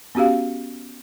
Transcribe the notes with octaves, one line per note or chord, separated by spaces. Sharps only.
B3 C#4 F#4 G4 F5